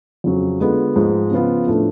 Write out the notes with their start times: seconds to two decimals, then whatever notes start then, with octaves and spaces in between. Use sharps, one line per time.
0.24 F2 C#3 F#3
0.60 D3 G#3 B3 F4 G#4
0.96 G#2 F3 G#3
1.31 C#3 F3 B3 F4
1.67 A2 F3 A3 D4